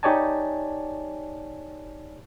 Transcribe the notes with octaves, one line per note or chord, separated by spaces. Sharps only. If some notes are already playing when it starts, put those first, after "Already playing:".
D#4 G4 C#5 D5 G#5 A5